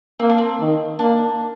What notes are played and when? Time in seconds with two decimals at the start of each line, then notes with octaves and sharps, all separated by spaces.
0.19 A#3 C4
0.30 D4
0.38 C4
0.60 D#3
0.99 A#3 D4